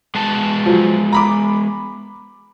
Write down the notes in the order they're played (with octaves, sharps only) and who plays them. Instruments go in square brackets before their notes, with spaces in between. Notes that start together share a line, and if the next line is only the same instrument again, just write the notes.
[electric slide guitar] G#3 B3 A5
[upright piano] F3 F#3
A#5 B5 D6